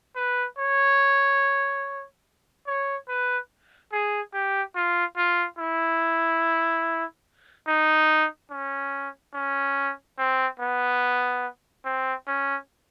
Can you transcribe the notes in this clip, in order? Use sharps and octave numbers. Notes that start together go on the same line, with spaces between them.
B4
C#5
C#5
B4
G#4
G4
F4
F4
E4
D#4
C#4
C#4
C4
B3
C4
C#4